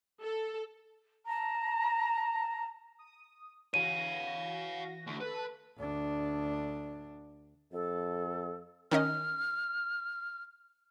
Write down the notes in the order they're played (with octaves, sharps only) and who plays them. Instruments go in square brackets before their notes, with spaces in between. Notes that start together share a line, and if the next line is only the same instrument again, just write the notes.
[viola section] A4
[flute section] A5 A#5
[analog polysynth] D#6
[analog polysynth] E3 F#4 A#6 [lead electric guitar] C#5 F5 [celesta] D#7
[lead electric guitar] D2
[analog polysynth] A4 A5 F#6 [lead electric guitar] B4
[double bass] D2 D4
[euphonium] F2 [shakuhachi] A4
[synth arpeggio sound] D#3 C#4 D#5 [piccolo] F6